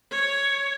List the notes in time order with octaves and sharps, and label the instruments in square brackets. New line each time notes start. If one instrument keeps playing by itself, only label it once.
[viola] C#5